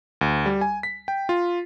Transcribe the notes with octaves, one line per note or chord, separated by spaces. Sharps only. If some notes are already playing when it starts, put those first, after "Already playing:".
D2
G3
G#5
B6
G5
F4